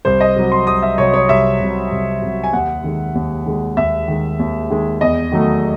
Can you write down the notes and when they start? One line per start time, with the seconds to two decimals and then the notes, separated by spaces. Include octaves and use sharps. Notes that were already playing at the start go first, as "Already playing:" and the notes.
0.05 C2 C5
0.20 D#5
0.36 C3 F#3
0.52 C6
0.67 C2 D#6
0.82 E5
0.98 C3 F#3 C#5
1.13 C#5
1.29 C2 E5
1.60 C3 F#3
1.91 C2
2.22 C3 F#3
2.44 G#5
2.53 D#2 F#5
2.84 D#3 G#3
3.15 D#2
3.46 D#3 G#3
3.77 D#2 E5
4.08 D#3 G#3
4.39 D#2
4.70 D#3 G#3
5.01 E2 D#5
5.32 D#3 F#3 A3